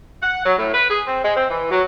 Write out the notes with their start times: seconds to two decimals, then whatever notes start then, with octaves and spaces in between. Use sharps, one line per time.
0.22 F#5
0.46 F#3
0.58 A2
0.74 B4
0.89 G#4
1.06 C4
1.24 G#3
1.36 C4
1.50 E3
1.70 F#3